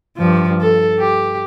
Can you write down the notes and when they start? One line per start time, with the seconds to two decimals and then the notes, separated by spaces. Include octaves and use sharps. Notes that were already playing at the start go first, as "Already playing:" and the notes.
0.17 G2 F3
0.61 A4
1.00 G4